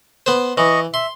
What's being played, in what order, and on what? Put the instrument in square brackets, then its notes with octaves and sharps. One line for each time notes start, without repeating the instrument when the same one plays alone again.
[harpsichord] B3 C5
[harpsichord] E3 [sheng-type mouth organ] D#5 C#6
[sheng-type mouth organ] E5 [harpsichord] C6